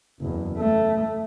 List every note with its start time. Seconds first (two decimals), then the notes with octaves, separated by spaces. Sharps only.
0.20 F#1 E2
0.58 A3